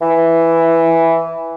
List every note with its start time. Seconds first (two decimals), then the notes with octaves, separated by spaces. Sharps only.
0.01 E3